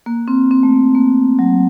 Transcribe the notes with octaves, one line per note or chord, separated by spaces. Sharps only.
A#3
C4
C4
A3
A#3
A#3
F#3